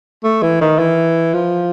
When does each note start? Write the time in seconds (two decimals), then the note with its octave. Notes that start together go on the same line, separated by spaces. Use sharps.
0.24 A3
0.42 E3
0.61 D#3
0.79 E3
1.34 F3